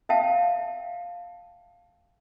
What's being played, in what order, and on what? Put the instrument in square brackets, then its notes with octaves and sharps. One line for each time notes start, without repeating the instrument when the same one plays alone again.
[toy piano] E5 F5 G5 A5